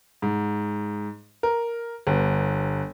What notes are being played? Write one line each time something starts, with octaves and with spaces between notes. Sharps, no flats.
G#2
A#4
G1